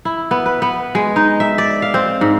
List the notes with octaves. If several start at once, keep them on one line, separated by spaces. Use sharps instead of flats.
E4
B3
B4
B3
G#3
D#4
E5
D5
F5
C4
G#2